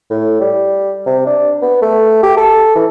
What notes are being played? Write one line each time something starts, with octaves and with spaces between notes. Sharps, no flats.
A2
G3
C3
D4
B3
A3
G4
A4
E3